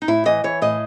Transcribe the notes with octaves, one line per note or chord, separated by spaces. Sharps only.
D#4
A2 E4
E3 D#5
E3 C#5
A2 D#5